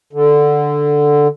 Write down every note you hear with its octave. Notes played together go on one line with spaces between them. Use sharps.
D3